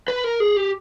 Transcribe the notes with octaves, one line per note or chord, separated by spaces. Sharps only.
B4
A#4
G#4
G4